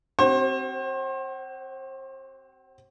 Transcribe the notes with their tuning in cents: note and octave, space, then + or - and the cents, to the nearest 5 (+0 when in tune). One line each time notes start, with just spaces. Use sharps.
C4 +0 F#4 +45 C5 +35